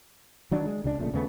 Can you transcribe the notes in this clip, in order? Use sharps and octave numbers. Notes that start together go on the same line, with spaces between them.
D#3 F#3 D4
G#3
C#2 C#3 G#3 D4
F1 A#2 C#3 A3
D#2 C#3 A3 B3